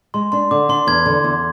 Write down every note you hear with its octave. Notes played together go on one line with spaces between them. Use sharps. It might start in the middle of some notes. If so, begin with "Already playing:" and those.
G#3 C6
D4 C6
D3 D6
D4 C6
E2 G#6
D3
E2